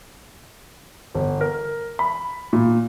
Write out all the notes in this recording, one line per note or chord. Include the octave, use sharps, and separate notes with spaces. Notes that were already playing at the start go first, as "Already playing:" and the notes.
G1
A#4
B5
A#2